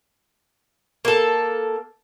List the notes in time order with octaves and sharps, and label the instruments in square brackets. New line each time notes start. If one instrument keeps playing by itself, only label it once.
[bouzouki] A#3 A4